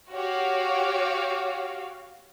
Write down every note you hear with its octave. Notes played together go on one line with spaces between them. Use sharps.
F#4 G4 C#5 F5